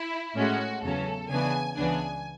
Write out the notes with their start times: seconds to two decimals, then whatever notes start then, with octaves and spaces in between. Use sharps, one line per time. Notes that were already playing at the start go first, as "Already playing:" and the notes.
Already playing: E4
0.35 A2 G#3 C#4 F#4
0.83 E2 C#3 F#3 C#4 A4
1.29 C#3 E3 B3 D4 G#5
1.76 C#2 C#3 E3 B3 D4 G#5